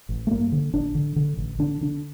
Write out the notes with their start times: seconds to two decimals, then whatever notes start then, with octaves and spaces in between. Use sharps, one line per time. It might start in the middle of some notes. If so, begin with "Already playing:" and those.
0.09 A1
0.27 A3
0.30 G2 A#3
0.52 D3
0.73 A1 D4
0.95 D3
1.16 D3
1.37 A1
1.59 D3 D4
1.81 D3 D4